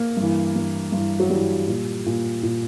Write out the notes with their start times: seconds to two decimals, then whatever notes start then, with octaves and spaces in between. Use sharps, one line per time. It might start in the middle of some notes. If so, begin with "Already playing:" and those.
Already playing: A#3
0.17 G2
0.22 E3
0.56 G2 E3
0.92 G2 E3
1.20 F#3
1.30 G2 E3 G3
1.68 A#2
2.06 A#2
2.43 A#2